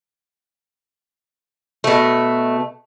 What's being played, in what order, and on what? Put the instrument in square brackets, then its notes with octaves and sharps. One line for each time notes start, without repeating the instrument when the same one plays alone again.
[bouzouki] B2 A3